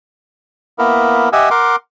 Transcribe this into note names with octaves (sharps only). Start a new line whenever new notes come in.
A#3 B3 E4 A#4
G4 D#5 E5 F#5 G#5
A#4 F#5 C6 D6